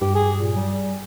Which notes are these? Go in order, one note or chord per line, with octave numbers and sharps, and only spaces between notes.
G2 G4
G#4
A#2
G3